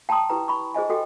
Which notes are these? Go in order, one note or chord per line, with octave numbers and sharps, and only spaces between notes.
G5 A5 A#5 C6 D#6
E4 G4 B4 A#5
B5 C#6
G#4 C5 D#5 G#5
F#4 G4 A4 D#5 G5